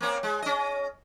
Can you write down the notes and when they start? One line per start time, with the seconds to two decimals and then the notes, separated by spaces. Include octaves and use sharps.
0.01 A#3 C4 C#4
0.23 G#3
0.42 C#4 D#5